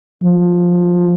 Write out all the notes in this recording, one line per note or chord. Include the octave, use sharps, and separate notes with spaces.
F3